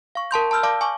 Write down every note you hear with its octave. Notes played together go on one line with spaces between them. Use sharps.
F5 C#6
A#4 A5 C6 G6
A5 B5 E6 F6 G6
D5 F5 A5 D6
G#5 C#6 D6